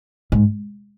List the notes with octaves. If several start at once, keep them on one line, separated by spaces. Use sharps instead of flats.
G#2